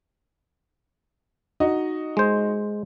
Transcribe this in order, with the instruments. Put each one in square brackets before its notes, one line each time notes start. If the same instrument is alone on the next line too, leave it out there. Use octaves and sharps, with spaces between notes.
[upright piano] D#4 F#4 D#5
[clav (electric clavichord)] G#3 C5